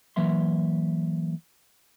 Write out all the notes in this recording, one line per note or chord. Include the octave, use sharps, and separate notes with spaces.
E3 F#3 A#3 E5 C6